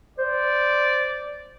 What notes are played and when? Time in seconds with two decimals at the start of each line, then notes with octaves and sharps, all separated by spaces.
0.18 C5 D5